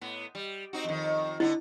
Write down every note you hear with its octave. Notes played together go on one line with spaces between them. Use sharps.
A2 B3
G3
C4 D#4 F#4
F2 D#3
D3 B3 E4